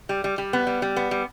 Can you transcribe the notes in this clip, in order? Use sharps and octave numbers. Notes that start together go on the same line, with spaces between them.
G3
G3
G3
B3
G3
G3
B3
G3